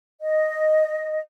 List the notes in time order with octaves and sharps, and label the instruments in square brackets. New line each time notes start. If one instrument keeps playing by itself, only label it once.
[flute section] D#5